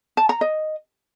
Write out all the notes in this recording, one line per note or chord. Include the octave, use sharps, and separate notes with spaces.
A5
A#5
D#5